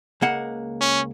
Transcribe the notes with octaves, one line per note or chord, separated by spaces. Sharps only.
C#2 A#3 F#5
C#4